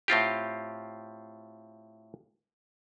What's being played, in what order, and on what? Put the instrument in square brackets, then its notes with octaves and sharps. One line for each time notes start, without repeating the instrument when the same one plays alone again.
[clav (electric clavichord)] A2 C4 F4 G4